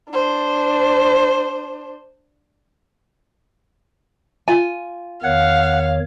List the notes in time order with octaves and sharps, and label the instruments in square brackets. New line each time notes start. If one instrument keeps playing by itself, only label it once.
[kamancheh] D4 C5
[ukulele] F4 G#5
[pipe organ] E2 D#3 C#5 [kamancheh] F5 [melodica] F#5